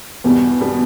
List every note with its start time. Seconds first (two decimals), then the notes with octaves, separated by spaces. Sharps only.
0.24 E2 B2 G3
0.61 B2 G3